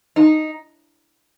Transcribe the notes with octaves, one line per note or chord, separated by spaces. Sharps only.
D#4